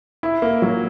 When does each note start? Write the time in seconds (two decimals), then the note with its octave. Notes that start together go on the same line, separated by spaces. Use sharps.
0.23 E4
0.42 A#3
0.62 F#3